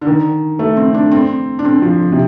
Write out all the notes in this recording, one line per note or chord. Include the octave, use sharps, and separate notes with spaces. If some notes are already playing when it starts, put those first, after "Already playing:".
D3
D#3
A3
C4
D4
C4
D4
C4
F3
C3